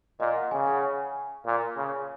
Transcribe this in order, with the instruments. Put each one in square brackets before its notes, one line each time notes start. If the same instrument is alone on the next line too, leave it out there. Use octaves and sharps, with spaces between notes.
[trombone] A#2 [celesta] D#5
[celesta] F#5
[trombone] C#3 [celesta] G#5
[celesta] F#5
G#5
[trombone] A#2
C#3